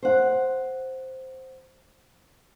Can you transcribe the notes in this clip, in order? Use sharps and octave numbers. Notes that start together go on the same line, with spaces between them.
C5 F#5